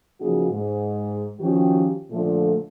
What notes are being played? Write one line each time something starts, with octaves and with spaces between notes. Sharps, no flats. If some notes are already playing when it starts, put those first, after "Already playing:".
C#3 F3 A#3 D#4 F#4 G#4
G#2
D#3 F3 C#4 F#4 G4
A#2 D3 F3 A3